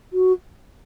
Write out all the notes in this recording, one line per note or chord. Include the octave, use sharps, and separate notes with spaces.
F#4